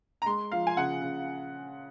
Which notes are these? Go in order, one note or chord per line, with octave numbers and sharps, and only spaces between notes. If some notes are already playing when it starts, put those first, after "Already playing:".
A#5
G#3 C6
F3 F5
G#5
C#3 F#5
C#3